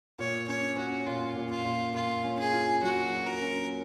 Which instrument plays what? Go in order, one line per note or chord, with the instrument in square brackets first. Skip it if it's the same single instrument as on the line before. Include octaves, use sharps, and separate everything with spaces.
[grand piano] A#2 [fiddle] C#5
[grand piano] C#4 [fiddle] C#5
[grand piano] C#4 [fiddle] F#4
[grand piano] A#2 [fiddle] F4
[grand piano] A#2
[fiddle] F4
[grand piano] A#2
[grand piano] A#2 [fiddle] F4
[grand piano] C#4
[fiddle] G#4
[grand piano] F4
[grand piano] F#3 [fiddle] F#4
[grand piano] F4
[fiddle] A#4
[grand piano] C#4